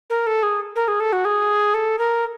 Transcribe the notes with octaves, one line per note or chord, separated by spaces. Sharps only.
A#4
A4
G#4
A#4
G#4
A4
F#4
G#4
A4
A#4